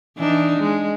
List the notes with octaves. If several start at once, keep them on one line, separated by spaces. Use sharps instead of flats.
E3 D4 D#4
G#3